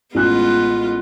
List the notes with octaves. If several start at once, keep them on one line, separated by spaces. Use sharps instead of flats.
A1 G#3 B3 F4 F#6